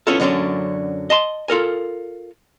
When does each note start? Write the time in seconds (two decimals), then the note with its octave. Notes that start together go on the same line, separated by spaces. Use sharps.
0.07 B3 C#4 E4 F4 A4
0.20 F#2 D3 F#3 B3 C#4 D4
1.10 D#5 A5 C6
1.48 F4 A4 A#4 G#5